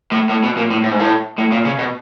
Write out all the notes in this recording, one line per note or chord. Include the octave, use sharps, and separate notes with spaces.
A2
A2
B2
A#2
A2
A2
G#2
A2
A2
A#2
C#3
B2